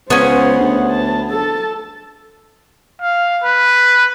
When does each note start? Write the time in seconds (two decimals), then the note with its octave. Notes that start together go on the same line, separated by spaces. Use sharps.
0.10 C#2 B3 C#4 C5 F#5
0.60 D2
0.90 A5
1.29 A4 A5
3.01 F5
3.44 B4